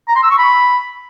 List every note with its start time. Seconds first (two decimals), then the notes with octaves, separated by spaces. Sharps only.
0.08 A#5
0.16 C6
0.23 E6
0.31 C#6
0.38 B5